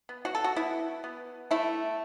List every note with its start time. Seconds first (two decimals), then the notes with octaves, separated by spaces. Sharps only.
0.09 B3
0.25 F#4
0.35 A4
0.44 F#4
0.56 B3 E4
1.04 B3
1.51 A3 E4